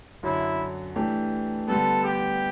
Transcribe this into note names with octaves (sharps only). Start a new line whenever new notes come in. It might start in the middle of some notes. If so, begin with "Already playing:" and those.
F#2 D3 F#3 E4
E3 A3 D4 G4
D3 G3 B3 A4
G4